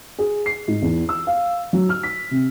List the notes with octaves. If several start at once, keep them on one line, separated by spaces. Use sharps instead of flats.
G#4
C7
G#2
E2
E6
F5
F#3
F6
B6
C3